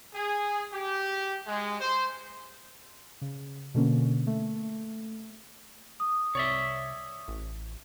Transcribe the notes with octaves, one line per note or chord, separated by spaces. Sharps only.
G#4
G4
G#3
C5
C#3
B2 D3 A#3 C#4
A3
D#6
C2 C#5 D5 E5
A1